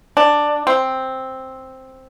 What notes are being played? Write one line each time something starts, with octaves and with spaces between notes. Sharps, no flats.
D4
C4